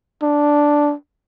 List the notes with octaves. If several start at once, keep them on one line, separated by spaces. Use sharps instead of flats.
D4